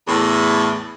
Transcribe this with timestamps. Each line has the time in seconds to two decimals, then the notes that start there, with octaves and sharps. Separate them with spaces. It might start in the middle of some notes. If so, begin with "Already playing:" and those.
0.08 E2 A2